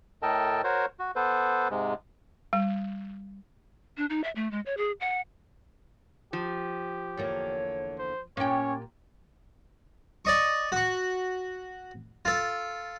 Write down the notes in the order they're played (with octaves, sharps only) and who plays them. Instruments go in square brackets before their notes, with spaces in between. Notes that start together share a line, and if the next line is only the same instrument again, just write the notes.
[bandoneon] A2 A4 A#4 D#5 G5 A5
F#4 A#4 C5 C#5
F#4
B3 A4 B4 C5
G#2 C3 G#3
[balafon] G3
[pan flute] D4
D#4
E5
A3
G#3
C#5
G#4
F#5
[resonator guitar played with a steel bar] F3 [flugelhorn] G4
[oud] E2 D3 A#3 [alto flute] C#5
[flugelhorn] C5
[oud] A#2 G4 [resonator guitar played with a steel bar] A#3 G5 [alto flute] C#4 [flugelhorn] C#5
[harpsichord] D5 D#5 C#6
F#4 C#6
F4 A4